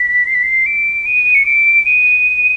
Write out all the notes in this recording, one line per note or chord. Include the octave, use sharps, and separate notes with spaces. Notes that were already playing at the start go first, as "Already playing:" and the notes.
Already playing: B6
C7
B6
C7
D7
D#7
C#7
D7
D#7